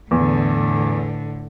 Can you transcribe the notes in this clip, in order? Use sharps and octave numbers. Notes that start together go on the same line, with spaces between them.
E2 A2 D3